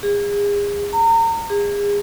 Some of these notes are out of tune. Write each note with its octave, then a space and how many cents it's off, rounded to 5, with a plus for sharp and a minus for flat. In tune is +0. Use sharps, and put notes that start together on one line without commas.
G#4 -35
A#5 -30
G#4 -35